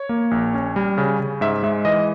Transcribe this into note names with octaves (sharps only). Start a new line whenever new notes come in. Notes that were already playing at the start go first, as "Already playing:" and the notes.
Already playing: C#5
A#3
A#1
C#4
G3
C#3
C#3
G#2 E5
G#3 E5
E3 D#5